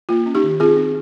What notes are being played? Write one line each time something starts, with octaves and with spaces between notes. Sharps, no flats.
A#3 F4
C#4
D#4 G4
D#3
C4 F4 G#4
C4